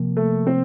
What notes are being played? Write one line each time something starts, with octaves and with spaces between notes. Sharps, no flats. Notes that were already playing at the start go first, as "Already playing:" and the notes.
Already playing: C3 F3 A#3
A3 A4
C4 C5